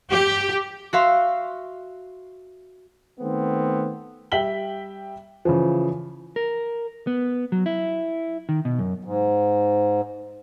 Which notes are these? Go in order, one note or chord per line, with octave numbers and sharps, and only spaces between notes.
G4
F#4 E5 F5 C6
D#3 A3 B3 C4
G3 E5 G5 B6 F#7 G7
C#3 E3 F3
A#4
B3
F#3
E4
D#3
B2
F#2
G#2